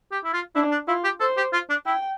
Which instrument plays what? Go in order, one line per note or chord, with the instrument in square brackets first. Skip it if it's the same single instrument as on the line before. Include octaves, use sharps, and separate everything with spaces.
[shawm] G4
E4
F4
[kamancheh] D4 [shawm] E4
[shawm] D4
[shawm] E4 [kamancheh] F4
[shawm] G4
[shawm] A4 [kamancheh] C5
[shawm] G4
F4
D4
[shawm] E4 [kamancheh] G5